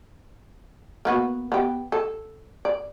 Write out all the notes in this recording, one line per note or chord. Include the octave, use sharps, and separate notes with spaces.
A#3 B3 F#4
B3 G4
A4
D5